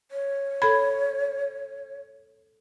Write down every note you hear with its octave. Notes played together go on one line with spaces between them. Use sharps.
C#5
A4 B5 G#6